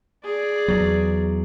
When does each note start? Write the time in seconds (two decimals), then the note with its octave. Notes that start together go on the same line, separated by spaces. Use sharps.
0.24 G#4 D5
0.68 E2 F#3